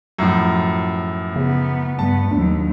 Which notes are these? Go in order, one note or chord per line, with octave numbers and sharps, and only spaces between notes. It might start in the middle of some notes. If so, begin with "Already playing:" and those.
F#2 A2 F3
C#3 B3
G2 B3 A5
D#2 F#3 D4